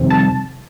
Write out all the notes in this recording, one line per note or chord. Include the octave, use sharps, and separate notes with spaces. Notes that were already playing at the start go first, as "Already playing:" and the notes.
Already playing: F2 C3 D#3 G3 C4
A5